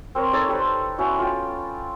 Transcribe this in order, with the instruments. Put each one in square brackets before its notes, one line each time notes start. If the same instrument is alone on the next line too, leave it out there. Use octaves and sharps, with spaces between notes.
[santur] C4 A#4 C#5
D#4 A4 C#5 D5
G4 A4 B4 C5
B3 C#4 E4 F#4
F4 G5